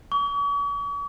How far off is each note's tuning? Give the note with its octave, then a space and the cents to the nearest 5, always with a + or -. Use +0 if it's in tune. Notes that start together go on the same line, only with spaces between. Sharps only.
C#6 +45